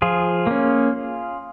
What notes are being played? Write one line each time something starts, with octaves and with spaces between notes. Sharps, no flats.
F3 F4 G#4
A#3 C#4